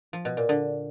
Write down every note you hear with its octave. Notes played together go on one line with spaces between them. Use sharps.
F3
B2
A#2
D3